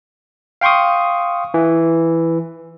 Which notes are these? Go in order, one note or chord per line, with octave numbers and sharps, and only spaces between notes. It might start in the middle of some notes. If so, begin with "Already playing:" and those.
F5 G5 C6 C#6 D#6
E3